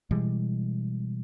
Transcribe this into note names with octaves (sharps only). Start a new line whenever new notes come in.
B2 E3 G3 G#3